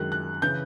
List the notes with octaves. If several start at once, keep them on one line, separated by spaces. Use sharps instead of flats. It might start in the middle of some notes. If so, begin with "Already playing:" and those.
Already playing: F#2 D#3 G#3 F#6
F#6
C#3 E3 G6